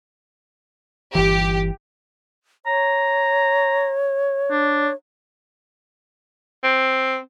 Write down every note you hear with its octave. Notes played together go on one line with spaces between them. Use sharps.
G1 E3 G4
C#5 A#5
D4
C4